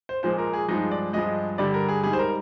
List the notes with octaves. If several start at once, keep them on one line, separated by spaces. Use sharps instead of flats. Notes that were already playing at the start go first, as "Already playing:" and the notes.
C5
A#2 F3 G#3 C5
A#4
G#4
G2 F3 G#3 D#4
D5
G2 F3 G#3 D#5
G2 D3 G3 D5
A#4
G#4
G#2 G3 G#4
C5
A#4